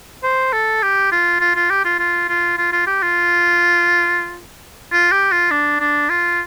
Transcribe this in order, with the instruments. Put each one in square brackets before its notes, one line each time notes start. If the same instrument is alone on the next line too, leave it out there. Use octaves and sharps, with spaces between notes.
[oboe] C5
A4
G4
F4
F4
F4
G4
F4
F4
F4
F4
F4
G4
F4
F4
G4
F4
D4
D4
F4